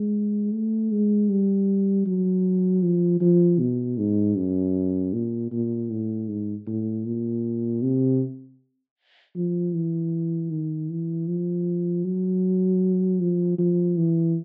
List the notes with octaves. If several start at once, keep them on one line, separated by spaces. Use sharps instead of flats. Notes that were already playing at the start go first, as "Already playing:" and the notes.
Already playing: G#3
A3
G#3
G3
F#3
F3
F3
B2
G#2
F#2
A#2
A#2
A2
G#2
A2
A#2
C3
F3
E3
D#3
E3
F3
F#3
F3
F3
E3